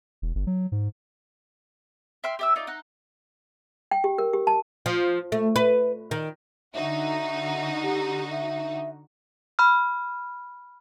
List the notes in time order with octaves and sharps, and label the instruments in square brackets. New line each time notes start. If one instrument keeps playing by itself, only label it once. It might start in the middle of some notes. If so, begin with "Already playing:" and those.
[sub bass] E1
G1
F#3
G#2
[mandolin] E5 G5 C6 F6
G4 E5 E6
D#4 F4 D5
D#4 F#5
[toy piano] G5
G4
A#4
G4
A5
[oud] F3
A3
B4
D#3
[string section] D3 D#4 F#4 [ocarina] E5
[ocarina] G4
E5
[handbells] B5 F6